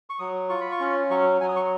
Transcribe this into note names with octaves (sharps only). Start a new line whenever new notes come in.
C#6
F#3 D#6
F4 C#6
B5
C#6
C#4
F#3 C#6
F#3 G#5
D#6
C#6